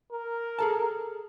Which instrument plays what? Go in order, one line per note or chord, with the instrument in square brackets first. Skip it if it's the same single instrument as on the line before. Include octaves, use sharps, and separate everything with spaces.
[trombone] A#4
[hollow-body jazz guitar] G#4 A4 A5